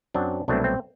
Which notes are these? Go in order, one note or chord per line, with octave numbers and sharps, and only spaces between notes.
F#2 F#3 C4 D4
C2 B2 F#3 A3 C4 D4
C4